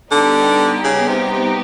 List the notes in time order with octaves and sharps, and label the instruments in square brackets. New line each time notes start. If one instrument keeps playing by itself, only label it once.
[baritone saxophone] D3 [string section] G3 B3 D#4 G4
[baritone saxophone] C#3
C3
C3